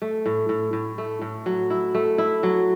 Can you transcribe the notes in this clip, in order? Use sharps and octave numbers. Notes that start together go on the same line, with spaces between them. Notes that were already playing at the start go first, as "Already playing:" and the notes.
A3
A2
A2
A2
A3
A2
F#3
E4
A3
E4
F#3